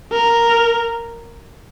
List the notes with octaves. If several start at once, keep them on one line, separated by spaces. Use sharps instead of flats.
A#4